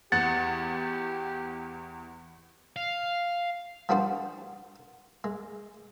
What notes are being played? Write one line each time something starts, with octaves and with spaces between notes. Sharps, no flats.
E2 G4 F#5 A6
F5
F3 G3 C#4 D4 F#4 C5
G#3